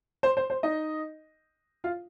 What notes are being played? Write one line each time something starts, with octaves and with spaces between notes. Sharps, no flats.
C5
C5
C5
D#4 D#5
F4 F5